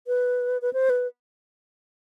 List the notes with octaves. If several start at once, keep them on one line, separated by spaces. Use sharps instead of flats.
B4
B4
C5
B4